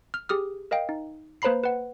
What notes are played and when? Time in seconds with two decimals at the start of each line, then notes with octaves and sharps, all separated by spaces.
0.14 F6
0.29 G4 G#4 D#6 F6
0.71 A#4 D#5 F5 G5
0.89 D#4
1.42 A#3 B4 C5 A#5 B5 C7
1.63 B4 F#5